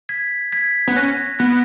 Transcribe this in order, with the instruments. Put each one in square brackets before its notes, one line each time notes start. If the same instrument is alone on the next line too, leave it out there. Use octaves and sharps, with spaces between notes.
[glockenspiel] G#6 B6
G#6 B6
[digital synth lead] B3
[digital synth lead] C#4 [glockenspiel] F#6 A#6
[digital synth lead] B3 [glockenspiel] F#6 A#6